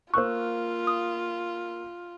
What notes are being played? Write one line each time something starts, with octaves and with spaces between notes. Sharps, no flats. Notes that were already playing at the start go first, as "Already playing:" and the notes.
A#3 F4 C5 C#6 E6 F#6
D#6